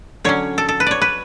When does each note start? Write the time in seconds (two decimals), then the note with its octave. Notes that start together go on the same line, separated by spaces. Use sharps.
0.24 D3 F#3 C#4 C#5
0.58 A4
0.69 A4
0.80 B4
0.86 C#5 D5
1.01 B4